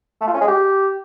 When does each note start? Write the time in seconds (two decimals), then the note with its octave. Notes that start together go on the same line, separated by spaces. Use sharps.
0.21 A3
0.28 F4
0.34 C#4
0.41 G#3
0.48 G4